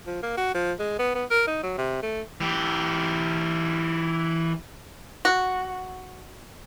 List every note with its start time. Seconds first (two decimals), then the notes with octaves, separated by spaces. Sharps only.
0.07 F3
0.23 A#3
0.38 F#4
0.55 F3
0.79 G#3
0.99 B3
1.15 B3
1.31 A#4
1.47 D#4
1.63 F#3
1.78 C3
2.03 A3
2.41 E3 G4
5.25 F#4